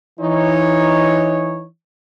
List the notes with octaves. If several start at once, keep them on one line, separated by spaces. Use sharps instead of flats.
E3 D#4 C#5